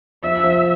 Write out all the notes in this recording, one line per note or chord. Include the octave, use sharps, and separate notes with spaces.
F3 E5
F3